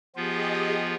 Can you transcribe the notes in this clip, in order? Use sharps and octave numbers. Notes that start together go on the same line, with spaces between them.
F3 B3 F4 G4 G#4 D#5